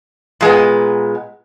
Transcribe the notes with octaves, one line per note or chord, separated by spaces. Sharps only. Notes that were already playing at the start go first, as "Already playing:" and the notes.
A#2 G#3 B3